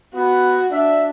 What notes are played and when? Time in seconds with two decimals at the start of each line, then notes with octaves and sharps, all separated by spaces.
0.15 B3 F#4
0.73 D4 E5